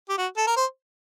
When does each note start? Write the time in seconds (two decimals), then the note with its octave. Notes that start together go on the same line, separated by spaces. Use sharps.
0.09 G4
0.18 F#4
0.37 A4
0.47 A#4
0.56 C5